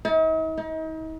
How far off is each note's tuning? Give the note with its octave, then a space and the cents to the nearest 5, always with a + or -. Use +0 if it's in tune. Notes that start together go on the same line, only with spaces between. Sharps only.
D#4 +45
D#4 +35